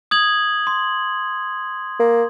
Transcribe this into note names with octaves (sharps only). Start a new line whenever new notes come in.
D#6 G#6 F#7
C6
A#3